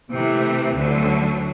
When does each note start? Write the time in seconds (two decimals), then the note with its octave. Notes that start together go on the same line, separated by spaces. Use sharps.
0.11 C3 E3 A3
0.75 D2 D3 F#3